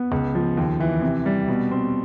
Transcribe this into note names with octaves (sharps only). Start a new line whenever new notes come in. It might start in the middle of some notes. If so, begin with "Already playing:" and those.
Already playing: B3
C#2
F3
D#2
E3
C3
G3
B2
C4